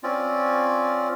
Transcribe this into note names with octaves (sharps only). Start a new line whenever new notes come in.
C4 C#4 F4 D5